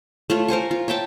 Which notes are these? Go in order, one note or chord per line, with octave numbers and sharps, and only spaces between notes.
A3 F4 C#5
A#4 C5 G#5 C#6
F4
C#5 E5 G5 A5